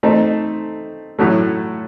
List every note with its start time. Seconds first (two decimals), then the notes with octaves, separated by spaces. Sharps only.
0.03 A3 C4 D#4 A4
1.19 A2 F#3 A3